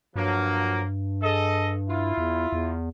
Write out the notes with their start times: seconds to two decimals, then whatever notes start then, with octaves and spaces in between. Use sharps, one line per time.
0.16 G2 F3 F#3 A#3
1.23 G#4 A4 D#5
1.89 E4 F4
2.18 E2
2.53 E2